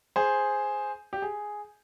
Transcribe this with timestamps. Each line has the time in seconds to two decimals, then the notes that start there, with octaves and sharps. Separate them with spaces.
0.16 G#4 C5
1.13 G4
1.22 G#4